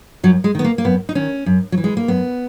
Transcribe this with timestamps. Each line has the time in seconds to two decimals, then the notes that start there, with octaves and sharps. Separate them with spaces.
0.23 F#2 F#3
0.44 G#3
0.55 D#3 B3
0.64 A#3
0.78 A#3
0.84 F#2 B3
1.09 D#4
1.15 D#3 C#4
1.46 F#2
1.72 F#3
1.78 E3
1.84 G#3
1.97 A#3
2.08 F#2 B3